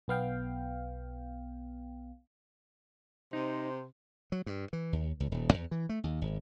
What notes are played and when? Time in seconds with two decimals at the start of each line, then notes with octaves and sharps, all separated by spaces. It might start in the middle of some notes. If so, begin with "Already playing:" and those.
0.08 B1 B3 F5 G5
3.33 C3 D#4 C5
4.32 F#3
4.46 G2
4.73 E3
4.93 D#2
5.20 C#2
5.32 D#1
5.54 E2
5.71 E3
5.89 A3
6.04 D#2
6.21 G#1